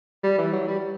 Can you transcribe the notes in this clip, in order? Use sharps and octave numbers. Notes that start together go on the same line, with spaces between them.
G3
E3
F#3
G3